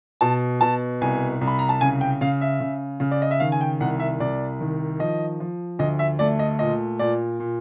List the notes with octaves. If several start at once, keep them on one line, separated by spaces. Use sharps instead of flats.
B2 A5
B2 A5
C2 G#5
C2
B5
A#5
A5
C#3 G#5
G5
C#3 F5
E5
C#3
C#3
D5
D#5
E5
D#3 F5
G#5
G5
C2 F#5
E5
C2 D5
D#3
F3 D#5
F3
D2 D#5
E5
A3 D5
D#5
A#2 D#5
A#2 D5
A#2